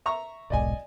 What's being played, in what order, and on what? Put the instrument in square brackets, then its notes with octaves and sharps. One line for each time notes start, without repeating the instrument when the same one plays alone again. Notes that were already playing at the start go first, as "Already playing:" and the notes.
[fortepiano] E5 A#5 C#6
[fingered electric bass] D#1 B1 G#2 [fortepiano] D5 D#5 G#5